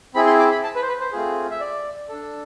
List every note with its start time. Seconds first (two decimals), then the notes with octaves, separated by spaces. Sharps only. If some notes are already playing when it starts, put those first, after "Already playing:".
0.14 C4 E4 G#4 B5
0.27 C6
0.39 D6
0.52 B5
0.64 A5
0.76 B4
0.82 C5
0.88 B4
1.00 C5
1.12 A3 C4 F4 G#4
1.50 E5
1.60 D5
2.09 D4 A4